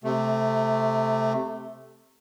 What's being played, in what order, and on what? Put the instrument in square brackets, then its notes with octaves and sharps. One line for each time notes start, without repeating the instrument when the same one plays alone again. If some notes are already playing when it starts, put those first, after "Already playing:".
[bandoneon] C3 A3